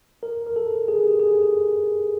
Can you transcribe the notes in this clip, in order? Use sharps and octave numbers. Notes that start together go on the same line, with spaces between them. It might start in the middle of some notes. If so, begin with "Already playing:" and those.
A#4
A#4
A4
G#4
G4
G#4